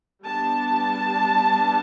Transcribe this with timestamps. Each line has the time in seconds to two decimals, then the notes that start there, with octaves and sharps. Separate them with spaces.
0.24 G3 B3 D4 A5